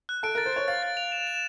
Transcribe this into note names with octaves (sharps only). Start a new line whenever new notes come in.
F#6
A4 D7
A#4 A6
C5
C#5 A6
F5 A6
A6
F7
E7
E7